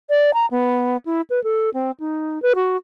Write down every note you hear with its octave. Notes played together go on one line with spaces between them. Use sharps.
D5
A#5
B3
E4
B4
A4
C4
D#4
B4
F#4